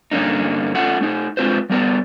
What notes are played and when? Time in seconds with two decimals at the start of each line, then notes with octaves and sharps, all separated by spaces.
0.12 G2 D3 A#3 C#4 D#4
0.75 A3 C#4 F4 F#5
1.01 A3 D#4
1.37 G#3 C4 F4 B4 C5
1.70 G3 B3 A#4 D5